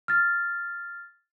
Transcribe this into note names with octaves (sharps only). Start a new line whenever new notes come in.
F6 A6